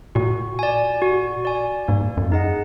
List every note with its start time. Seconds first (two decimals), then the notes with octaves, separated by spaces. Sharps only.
0.15 A#2 F#4
0.59 D5 G#5
1.02 F#4
1.45 D5 G#5
1.88 G#2 A#3
2.17 F#2
2.32 D#4 G#4 D#5 F#5